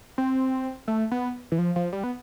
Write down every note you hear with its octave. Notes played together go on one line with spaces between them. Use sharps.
C4
A3
B3
E3
F3
F3
G3
B3